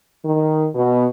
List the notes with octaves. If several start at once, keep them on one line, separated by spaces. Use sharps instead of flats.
D#3
B2